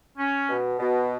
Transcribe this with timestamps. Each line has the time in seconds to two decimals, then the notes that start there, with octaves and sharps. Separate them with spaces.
0.17 C#4
0.49 B2
0.80 B2